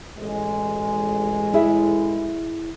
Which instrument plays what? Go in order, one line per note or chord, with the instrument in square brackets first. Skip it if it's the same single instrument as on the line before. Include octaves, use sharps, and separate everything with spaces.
[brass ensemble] A1 G#3
[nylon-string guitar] E4 G#4 E5